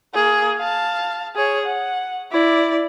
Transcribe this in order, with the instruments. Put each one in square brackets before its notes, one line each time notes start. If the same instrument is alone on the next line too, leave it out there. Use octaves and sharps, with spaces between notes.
[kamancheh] A#3 G#4
F5 A5
G#4 C#5
F#5
E4 D5